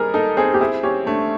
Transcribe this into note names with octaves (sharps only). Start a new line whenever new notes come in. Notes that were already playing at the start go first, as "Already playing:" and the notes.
Already playing: G3 C4 D#4 G#4 A#4
D#4 A4
C4 G#4
G4
E4 G#4
C#4 G4
A3 D4